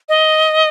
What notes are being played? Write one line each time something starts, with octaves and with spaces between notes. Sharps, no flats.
D#5